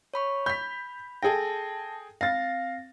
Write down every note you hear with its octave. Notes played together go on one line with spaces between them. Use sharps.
C#5 B5 C#6
B5 G6 B6
G#4 A4 G5 A5 A#6
C4 F5 A6 A#6